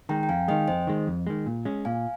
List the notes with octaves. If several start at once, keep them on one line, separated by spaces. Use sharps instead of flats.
D#3 G#3 G5 A#5
G5
F2 F5 G#5
D#3 G#3 D#5 G5
F2 C5 D#5
D#3 G#3
F2
D#3 G#3
A#2
G#3 C#4
A#2 F5 G#5